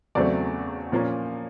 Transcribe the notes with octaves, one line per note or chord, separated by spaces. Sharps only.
E2 C#3 F#3 A3 C4 D5
A#2 F3 A#3 C#4